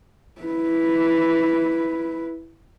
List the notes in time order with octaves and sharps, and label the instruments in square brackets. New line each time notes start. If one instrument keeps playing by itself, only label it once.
[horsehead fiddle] E4 B4